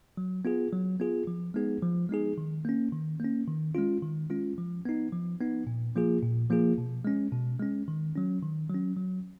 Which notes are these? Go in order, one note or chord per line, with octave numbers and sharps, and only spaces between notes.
F#3
B3 F4 G#4
F#3
B3 F4 G#4
F3
G#3 B3 D#4 G#4
F3
G#3 B3 D#4 G#4
D#3
A#3 C#4
D#3
A#3 C#4
D#3
G#3 C#4 F4
D#3
G#3 C#4 F4
F3
B3 D#4
F3
B3 D#4
A#2
F3 A#3 F4 G#4
A#2
F3 A#3 F4 G#4
B2
G#3 C#4
B2
G#3 C#4
D#3
F#3 C#4
D#3
F#3 C#4
F#3